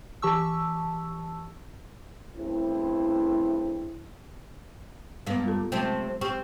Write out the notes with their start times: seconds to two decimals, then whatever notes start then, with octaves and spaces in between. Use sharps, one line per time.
0.22 E3 G4 A5 C#6 E6
2.36 G2 C#3 A3 C4 E4
5.27 G2 G#3 A#3 B3 B4
5.44 G3 F4 A4
5.72 C3 F#3 G#3 A3 C4
6.21 C4 G4 C#6